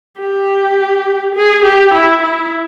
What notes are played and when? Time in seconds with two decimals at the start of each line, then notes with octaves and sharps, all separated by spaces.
0.19 G4
1.35 G#4
1.64 G4
1.94 E4
2.23 E4